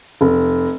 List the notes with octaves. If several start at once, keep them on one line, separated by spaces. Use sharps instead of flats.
F1